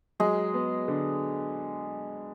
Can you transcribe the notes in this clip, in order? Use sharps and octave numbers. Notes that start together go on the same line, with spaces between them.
F#3 G#3
B3
D3